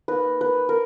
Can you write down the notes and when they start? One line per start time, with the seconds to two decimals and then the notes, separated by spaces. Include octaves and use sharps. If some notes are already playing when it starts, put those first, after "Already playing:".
0.08 A#3 D#4 B4
0.41 B4
0.69 A#4